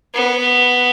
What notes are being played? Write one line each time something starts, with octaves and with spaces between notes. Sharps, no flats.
B3